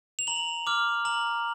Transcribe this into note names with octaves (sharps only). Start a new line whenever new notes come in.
F7
A#5 F#7
D6 F6
A#5 F#7